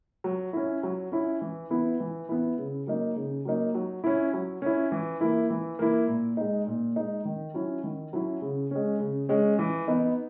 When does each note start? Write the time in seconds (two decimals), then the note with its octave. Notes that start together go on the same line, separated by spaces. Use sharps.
0.24 F#3
0.53 C#4 E4
0.83 F#3
1.12 C#4 E4
1.41 E3
1.70 B3 E4
2.00 E3
2.29 B3 E4
2.58 C#3
2.87 F#3 A#3 D#4
3.16 C#3
3.45 F#3 A#3 D#4
3.75 F#3
4.04 C#4 E4
4.33 F#3
4.62 C#4 E4
4.92 E3
5.21 A#3 E4
5.50 E3
5.79 A#3 E4
6.08 A#2
6.37 G#3 D#4
6.67 A#2
6.96 G#3 D#4
7.25 D#3
7.54 F#3 C#4 E4
7.84 D#3
8.13 F#3 C#4 E4
8.42 C#3
8.71 G#3 C#4
9.00 C#3
9.29 G#3 C#4
9.59 E3
9.88 B3 D#4